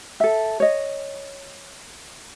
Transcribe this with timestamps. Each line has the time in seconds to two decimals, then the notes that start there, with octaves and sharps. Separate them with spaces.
0.20 A4 E5
0.60 C#5 D#5